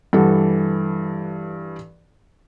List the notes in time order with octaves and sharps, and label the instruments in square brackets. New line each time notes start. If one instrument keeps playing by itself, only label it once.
[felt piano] G2 E3 A4 F#5